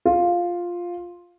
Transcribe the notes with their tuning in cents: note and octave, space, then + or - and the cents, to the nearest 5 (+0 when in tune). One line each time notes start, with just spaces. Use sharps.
F4 +5